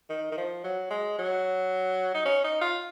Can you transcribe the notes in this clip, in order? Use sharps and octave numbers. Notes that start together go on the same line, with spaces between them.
D#3
D#3
F3
F#3
G#3
F#3
D#4
C#4
D#4
F4